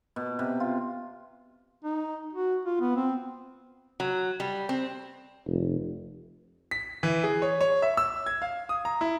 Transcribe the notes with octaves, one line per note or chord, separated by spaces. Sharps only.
B2
C3
F4
D#4
F#4
F4
B3
C4
F#3
G3
C4
F1
B6
E3
G#4
C#5
C#5
E5
E6
G#6
F5
D#6
A#5
E4